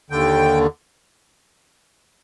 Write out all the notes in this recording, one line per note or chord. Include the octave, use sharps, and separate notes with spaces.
D#2 D3 G5